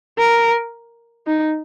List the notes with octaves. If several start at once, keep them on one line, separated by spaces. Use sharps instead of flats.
A#4
D#4